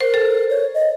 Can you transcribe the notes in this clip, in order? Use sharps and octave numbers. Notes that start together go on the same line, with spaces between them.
A#4 C5
A4
C#5
D#5